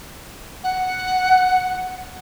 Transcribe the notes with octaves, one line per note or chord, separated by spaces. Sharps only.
F#5